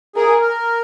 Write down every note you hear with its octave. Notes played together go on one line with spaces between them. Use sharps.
G#4 A#4
A#4